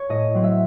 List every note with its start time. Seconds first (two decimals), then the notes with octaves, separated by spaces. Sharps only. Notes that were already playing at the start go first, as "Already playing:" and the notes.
Already playing: C#5
0.09 A2 D#5
0.35 F#3 C4
0.44 E5